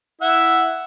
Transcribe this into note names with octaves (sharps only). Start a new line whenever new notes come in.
E4 E5 F#5